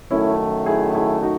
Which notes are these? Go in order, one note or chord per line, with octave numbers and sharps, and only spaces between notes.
F#2 D#3 A3 C#4 E4
E4 G#4
E4 G#4
D#4 F#4